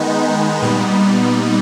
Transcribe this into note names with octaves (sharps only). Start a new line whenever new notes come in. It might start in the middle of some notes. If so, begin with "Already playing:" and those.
Already playing: D#3 G#3 B3 D#4
A#2 G3 B3 D#4